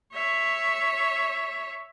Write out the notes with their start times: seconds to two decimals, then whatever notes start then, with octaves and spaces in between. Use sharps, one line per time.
0.13 C#5 E5